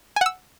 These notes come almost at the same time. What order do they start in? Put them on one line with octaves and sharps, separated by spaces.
G#5 F#5 E6